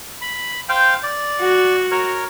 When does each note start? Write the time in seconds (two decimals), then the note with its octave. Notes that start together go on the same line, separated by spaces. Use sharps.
0.21 B5
0.69 C5 F5 G5
1.03 D5
1.41 F#4
1.91 A#4 C#5